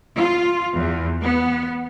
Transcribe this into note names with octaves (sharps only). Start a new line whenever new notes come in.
F4
E2
B3